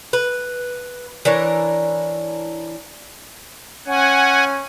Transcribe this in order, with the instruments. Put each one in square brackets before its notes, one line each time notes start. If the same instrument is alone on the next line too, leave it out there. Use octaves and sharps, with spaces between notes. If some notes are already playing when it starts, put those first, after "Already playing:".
[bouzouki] B4
E3 D4 A#4 C#5
[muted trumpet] C#4 [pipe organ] F#5 G#5